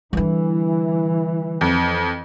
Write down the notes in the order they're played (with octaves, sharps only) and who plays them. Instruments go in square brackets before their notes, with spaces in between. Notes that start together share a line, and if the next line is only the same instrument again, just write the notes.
[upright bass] D3 G3 [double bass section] E3
[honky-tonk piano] F2